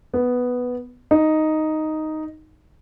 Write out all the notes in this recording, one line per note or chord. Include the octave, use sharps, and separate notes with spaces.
B3
D#4